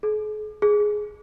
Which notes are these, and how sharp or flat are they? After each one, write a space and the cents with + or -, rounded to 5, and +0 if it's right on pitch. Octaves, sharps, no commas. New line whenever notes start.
G#4 +45
G#4 +5